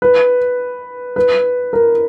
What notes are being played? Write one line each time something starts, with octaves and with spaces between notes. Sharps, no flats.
B4
B4
A#4